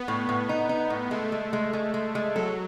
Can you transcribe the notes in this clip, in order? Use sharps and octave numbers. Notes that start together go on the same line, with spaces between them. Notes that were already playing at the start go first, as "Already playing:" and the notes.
Already playing: B3
A2
A2
D#4
D#4
A2
G#3 A3
G#3
G#3
G#3
G#3
G#3
F#3 A4